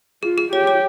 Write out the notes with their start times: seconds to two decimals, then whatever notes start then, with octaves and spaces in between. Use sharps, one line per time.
0.23 F4 G#4
0.38 G#4
0.52 G4 C#5
0.67 C#5